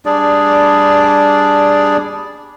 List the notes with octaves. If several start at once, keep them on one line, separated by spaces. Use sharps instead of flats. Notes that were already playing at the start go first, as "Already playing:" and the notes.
G3 D4 G#4 D5